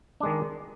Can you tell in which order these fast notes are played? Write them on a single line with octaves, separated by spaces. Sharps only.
D4 G#3 D#3